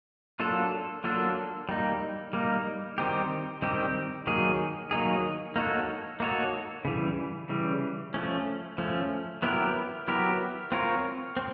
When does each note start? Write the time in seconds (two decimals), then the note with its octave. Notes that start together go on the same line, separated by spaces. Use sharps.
0.40 F#3 A#3 D4 F4 A4
1.04 F#3 A#3 D4 F4 A4
1.69 G3 A#3 D#4
2.33 G3 A#3 D#4
2.98 D#3 G3 C4 D#4 G4
3.62 D#3 G3 C4 D#4 G4
4.27 D#3 F#3 A#3 D#4 G#4
4.91 D#3 F#3 A#3 D#4 G#4
5.56 A#3 D#4 F#4 A4 C#5
6.20 A#3 D#4 F#4 A4 C#5
6.85 C#3 E3 G3
7.49 C#3 E3 G3
8.14 F3 A3 C#4
8.78 F3 A3 C#4
9.42 F#3 B3 E4 G4 A#4
10.08 F#3 B3 E4 G4 A#4
10.72 C4 F4 A#4 C#5
11.37 C4